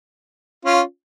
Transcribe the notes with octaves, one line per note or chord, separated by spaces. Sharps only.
C#4 F4